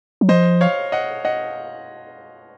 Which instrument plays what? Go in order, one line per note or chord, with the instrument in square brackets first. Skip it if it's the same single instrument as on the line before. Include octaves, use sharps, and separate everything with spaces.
[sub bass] F#3
[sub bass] F3 [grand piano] C5 D#5
[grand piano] C#5 F5
D#5 F#5
D#5 F#5